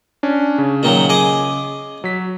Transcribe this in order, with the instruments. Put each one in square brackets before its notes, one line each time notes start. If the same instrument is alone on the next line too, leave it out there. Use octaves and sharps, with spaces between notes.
[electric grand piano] C#4 D4
C#3
[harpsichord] A#2 D#3 F#3
G#4 D#5 D6
[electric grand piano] F#3 B6